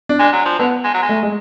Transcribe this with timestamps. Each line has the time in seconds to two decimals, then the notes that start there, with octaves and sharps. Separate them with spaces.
0.09 D4
0.20 G#3
0.33 F#3
0.45 F3
0.59 D3 B3
0.84 G#3
0.94 F#3
1.02 G#3
1.09 A3
1.23 G#3